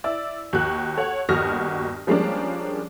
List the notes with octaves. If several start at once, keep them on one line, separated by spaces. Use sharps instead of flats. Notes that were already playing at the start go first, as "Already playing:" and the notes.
E4 D5 E6
D#2 F#4 F#6
A4 C#5 F#5
G1 D#2 F#4 D#6 F6 A#6
F3 G3 G#3 A#3 C#4 D4